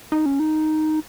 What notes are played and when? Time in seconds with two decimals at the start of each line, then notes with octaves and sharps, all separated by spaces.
0.12 D#4
0.26 C#4
0.39 D#4